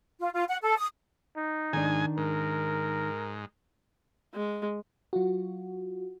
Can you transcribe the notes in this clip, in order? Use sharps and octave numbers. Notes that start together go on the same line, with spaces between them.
F4
F4
F#5
A4
D#6
D#4
G#2 D#3 D4 G#5
G#2 A#4
G#3
F#3 F4 F#4